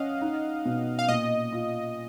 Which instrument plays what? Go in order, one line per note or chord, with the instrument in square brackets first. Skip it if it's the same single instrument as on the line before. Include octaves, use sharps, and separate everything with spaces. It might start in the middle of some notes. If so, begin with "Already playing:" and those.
Already playing: [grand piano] C#4 [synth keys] D#5 F5 F#5
[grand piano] D#4
B2
[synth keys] F5
[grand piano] A#2 [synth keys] D#5
[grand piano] F4